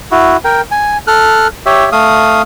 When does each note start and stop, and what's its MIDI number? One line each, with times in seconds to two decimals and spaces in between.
0.11 0.37 64
0.11 0.37 66
0.44 0.61 70
0.44 0.61 79
0.71 0.97 80
1.07 1.47 69
1.07 1.47 89
1.07 1.47 90
1.66 1.89 67
1.66 1.89 73
1.66 1.89 76
1.92 2.42 57
1.92 2.42 77
1.92 2.42 87